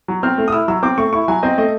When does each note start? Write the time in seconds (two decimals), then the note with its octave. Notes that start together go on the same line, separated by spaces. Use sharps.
0.08 F#3
0.23 C4 F6
0.38 A3
0.48 D#6
0.52 E4 E6
0.68 F#3 E6
0.83 C4 D6
0.98 A3 C#6
1.13 E4 C#6
1.28 F#3 G#5
1.43 C4 D#5
1.58 A3 D#5